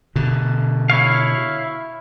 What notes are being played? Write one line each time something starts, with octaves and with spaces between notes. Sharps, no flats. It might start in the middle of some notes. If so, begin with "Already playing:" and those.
B2 D3
E4 C#5 F5